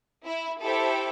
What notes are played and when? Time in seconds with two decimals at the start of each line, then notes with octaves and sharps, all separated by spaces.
0.26 E4
0.62 E4 G4 A4 C5 E5 G5